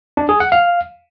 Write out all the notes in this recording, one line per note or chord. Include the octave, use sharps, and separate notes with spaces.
D4
G#4
F#5
F5